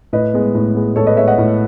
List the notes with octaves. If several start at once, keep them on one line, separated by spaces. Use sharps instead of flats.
A2 B4 D#5
G#3 B3
A2
G#3 B3
A2 A4 C#5
B4 D#5
G#3 B3 C#5 E5
D#5 F#5
A2